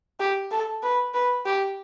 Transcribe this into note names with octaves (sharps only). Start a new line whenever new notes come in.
G4
A4
B4
B4
G4